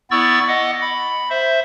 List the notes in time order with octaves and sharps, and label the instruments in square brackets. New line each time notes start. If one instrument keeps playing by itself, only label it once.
[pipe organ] B3 E4 D5 C#6 E6 A6
D#5 F#5 D6
B5
C5 E5